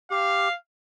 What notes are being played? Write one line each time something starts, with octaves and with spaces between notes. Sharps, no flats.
G4 F5